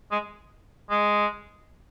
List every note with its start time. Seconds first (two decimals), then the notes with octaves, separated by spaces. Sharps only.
0.11 G#3
0.90 G#3